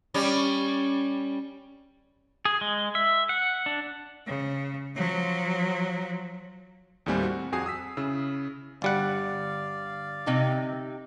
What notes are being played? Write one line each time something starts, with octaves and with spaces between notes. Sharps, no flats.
G3 C#4
G#4
G#3
E5
F#5
D4
C#3
F3 F#3
D#2 A2 G3 C4 G#5
F#4
F2 F#4 G#4 G#5 D#6 C7
D#6 E6 B6
C#3 E4 E6
G1 G3 D5 F5 F#5
C3 D#4 G4